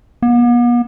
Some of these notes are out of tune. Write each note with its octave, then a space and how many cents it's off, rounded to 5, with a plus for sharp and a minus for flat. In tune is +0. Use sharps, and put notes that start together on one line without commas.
B3 -45